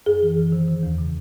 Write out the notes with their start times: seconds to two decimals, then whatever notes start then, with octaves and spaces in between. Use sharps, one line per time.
0.06 F#2 G#4
0.23 E3
0.37 E3
0.52 D#3
0.68 D#3
0.83 E2
0.98 C#3